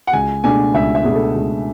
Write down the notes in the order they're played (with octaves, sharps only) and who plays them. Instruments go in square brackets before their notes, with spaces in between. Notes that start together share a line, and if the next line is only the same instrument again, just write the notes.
[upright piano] F#5
[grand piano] C#2 [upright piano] G#5
[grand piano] B2 A3 D4 G#4 [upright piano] G#5
[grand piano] C#2 [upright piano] E5
[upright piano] E5
[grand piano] B2 A3 D4 G#4
[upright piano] A4
[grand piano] C#2